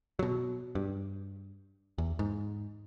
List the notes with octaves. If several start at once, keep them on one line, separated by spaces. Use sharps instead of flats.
B2 F#3
G2
E2
G#2